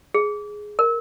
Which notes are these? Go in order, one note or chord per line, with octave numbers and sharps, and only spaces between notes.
G#4
A#4